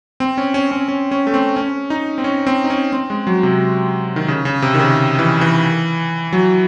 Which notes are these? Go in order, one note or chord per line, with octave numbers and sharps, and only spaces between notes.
C4
C#4
C#4
C#4
C#4
C#4
A3
C4
C#4
D#4
C4
C#4
C4
D#4
C#4
C4
G#3
F#3
C3
D#3
C#3
C#3
C3
D#3
C#3
E3
E3
F#3